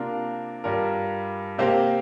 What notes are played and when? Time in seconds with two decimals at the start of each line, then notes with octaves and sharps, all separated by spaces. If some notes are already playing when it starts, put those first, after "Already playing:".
Already playing: C3 A#3 D4 F4 A#4
0.64 G2 G3 D4 F4 A#4
1.58 C3 A#3 G4 C5 F5